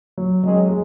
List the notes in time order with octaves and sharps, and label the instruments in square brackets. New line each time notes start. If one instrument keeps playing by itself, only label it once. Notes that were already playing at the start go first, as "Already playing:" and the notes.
[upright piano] F#3
[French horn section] D#3 G#3 C#4 G#4 D#5 [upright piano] F#3
[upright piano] G#3